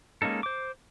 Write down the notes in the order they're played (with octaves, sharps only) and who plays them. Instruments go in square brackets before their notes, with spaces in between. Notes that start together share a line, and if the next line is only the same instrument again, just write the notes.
[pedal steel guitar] G#3 A#3 C#4 D#4 A4
C5 D6